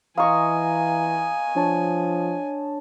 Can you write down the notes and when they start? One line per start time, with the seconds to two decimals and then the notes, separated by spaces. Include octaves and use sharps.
0.17 E3 D#5 F5 G#5 A#5 C#6
1.56 F3 D4 C#5 A5